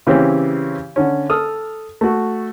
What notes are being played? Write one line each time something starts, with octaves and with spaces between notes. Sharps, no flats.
C#3 E3 C4 C#4 G4
D3 C#4
A4 D#6 F6
A3 F#4